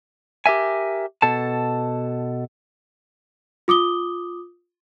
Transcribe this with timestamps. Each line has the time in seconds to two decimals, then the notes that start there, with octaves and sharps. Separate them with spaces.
0.46 G4 A#4 E5 G#5
1.22 B2 A4 A5
3.68 F4 D6 D#6 G7